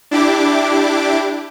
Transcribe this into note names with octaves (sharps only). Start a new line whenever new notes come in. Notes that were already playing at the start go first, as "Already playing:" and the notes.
D4 E4 G4 D6